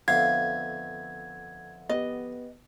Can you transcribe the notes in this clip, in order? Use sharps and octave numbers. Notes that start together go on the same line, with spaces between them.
F2 D3 B3 E5 F5 G#6
B3 G4 D#5